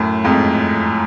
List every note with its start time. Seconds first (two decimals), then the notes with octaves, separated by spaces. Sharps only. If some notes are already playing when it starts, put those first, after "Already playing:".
Already playing: F#2 A2
0.24 F2 G#2